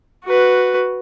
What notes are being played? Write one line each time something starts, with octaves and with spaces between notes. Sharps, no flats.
F#4 B4